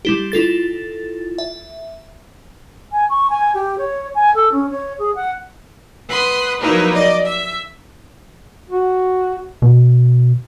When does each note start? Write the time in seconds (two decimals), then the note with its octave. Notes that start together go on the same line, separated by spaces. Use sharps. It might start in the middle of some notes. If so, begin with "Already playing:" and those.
0.05 G3 E4 G4
0.32 E4 F4 A4 A6
1.38 E5
2.92 G#5
3.10 C#6
3.30 G#5
3.54 G4
3.78 C#5
4.15 G#5
4.34 A4
4.52 C#4
4.70 C#5
4.99 G#4
5.15 F#5
6.08 B4 F#5 B5 C6 D#6
6.61 F3 F#3 A#3 D#4 E4 B4
6.93 D5 D#5
7.25 E5
8.70 F#4
9.62 B2